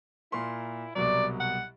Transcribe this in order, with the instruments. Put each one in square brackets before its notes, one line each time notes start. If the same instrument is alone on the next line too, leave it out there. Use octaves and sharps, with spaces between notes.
[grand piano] A#2 A#4 C6 [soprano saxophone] E4
[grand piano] C2 B2 F#3 [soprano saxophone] D5
[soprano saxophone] F#5